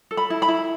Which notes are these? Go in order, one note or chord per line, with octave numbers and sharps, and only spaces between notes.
A4
B5
E4
B5
E4